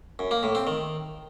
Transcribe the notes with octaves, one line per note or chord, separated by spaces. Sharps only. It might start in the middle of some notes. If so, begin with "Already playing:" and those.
F#2
A#3
A2
C4
D#3